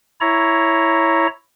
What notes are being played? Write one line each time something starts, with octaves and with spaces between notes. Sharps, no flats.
E4 C#5 A#5